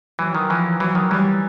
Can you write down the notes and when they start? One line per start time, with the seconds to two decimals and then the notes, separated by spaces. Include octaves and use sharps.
0.19 E3 F#3
0.35 D#3
0.50 E3 F3
0.80 E3 F#3
0.95 D#3
1.11 E3 G3